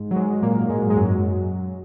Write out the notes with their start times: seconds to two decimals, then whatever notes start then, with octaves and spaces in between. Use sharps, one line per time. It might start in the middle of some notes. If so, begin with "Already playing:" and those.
Already playing: G#2 G#3
0.11 F#3
0.16 G#2 G#3
0.43 A#2 A#3
0.70 G#2 G#3
0.90 G#3
0.96 F#2 F#3